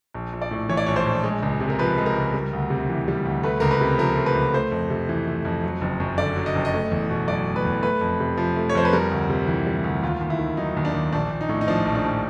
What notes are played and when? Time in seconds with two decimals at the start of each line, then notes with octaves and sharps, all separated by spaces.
0.14 A#1
0.33 A#1
0.42 D5
0.51 A2
0.69 E3 C#5
0.77 D5
0.86 A#1 C#5
0.96 C5
1.06 A#1
1.24 G#3
1.43 C#2
1.60 C3
1.70 A#4
1.79 F3 B4
1.98 G#3
2.06 A#4
2.16 C#2
2.34 G3
2.53 D2
2.70 C3
2.89 E3
3.08 G3
3.25 D2
3.43 A3 B4
3.60 C#2 A#4
3.71 B4
3.81 C3
3.98 F3 A#4
4.17 A3
4.26 B4
4.36 C#2
4.54 A3 C5
4.72 F2
4.90 C3
5.09 E3
5.27 A3
5.45 F2
5.64 F#3
5.81 F#1
6.00 F#2
6.18 D3 D5
6.36 F#3
6.46 D#5
6.55 F#1
6.65 D#5
6.74 A3
6.92 E2
7.10 B2
7.28 F#3 D5
7.47 A3
7.56 B4
7.65 E2
7.83 A3 B4
8.01 F2
8.20 C3
8.37 F3
8.56 A3
8.69 C#5
8.75 F2 C5
8.85 B4
8.93 G3 A#4
9.11 D2
9.29 C3
9.47 E3
9.67 G3
9.84 D2
10.02 D#2 F4
10.21 D#2
10.30 E4
10.39 D#3
10.57 F#3 D#4
10.77 D#2
10.85 D4
10.94 D#2
11.13 A#1 D4
11.30 A#1
11.41 D#4
11.49 A2
11.61 D#4
11.68 F3 D4
11.86 A#1
11.95 D4
12.04 A#1